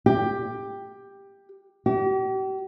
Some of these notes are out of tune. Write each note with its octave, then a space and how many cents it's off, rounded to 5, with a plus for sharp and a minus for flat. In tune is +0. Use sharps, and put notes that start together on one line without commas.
G4 +10
G4 -40